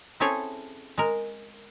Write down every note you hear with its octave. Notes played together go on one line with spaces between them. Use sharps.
C4 C#4 E4 G#4 A4 C#5
G#3 A#4